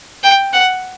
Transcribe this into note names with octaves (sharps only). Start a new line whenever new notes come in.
G5
F#5